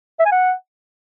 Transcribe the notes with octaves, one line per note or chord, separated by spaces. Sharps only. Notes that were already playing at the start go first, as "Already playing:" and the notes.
E5
G#5
F#5